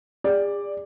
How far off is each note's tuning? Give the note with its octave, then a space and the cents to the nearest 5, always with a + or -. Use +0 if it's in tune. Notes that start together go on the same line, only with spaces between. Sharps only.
G#4 -45 D5 +0